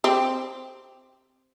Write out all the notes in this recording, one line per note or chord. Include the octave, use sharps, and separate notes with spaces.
C4 G4